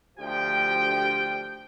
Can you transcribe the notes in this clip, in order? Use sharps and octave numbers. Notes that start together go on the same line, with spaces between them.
D2 F3 G4 G5